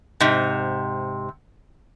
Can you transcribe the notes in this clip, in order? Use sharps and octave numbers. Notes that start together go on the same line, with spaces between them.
G#2 C3